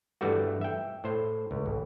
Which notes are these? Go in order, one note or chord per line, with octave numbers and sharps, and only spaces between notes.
G2 E3 G3 A3 F#4
E5 G5
A2 C5
C#2
A1